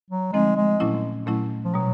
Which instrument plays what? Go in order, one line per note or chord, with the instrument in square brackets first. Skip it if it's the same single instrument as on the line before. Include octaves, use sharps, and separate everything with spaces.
[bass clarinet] F#3
[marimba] D3 F3 A3 C4 D#4 [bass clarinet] G#3
[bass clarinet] G#3
[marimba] A#2 F#3 A3 C#4 E4
A#2 F#3 A3 C#4 E4
[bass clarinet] F3
[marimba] B2 G3 [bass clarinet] F#3